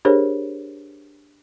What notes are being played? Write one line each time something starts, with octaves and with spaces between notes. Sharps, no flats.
D4 G4 G#4 A#4 C5 C#5